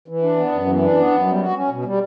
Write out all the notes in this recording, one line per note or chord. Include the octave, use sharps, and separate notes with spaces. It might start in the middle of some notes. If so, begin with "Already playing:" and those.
E3
D4
B3
F#2
E3
D4
B3
F#2
G3
F#4
C#4
B2
G3